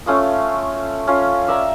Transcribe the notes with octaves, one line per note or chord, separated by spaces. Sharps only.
A3 C#4 F4 D#6
C#4 F4
D5 E5 G5 A#5